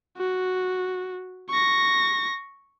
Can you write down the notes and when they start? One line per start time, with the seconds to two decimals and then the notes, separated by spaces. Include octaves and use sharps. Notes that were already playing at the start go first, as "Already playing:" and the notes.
0.17 F#4
1.50 C#6 A#6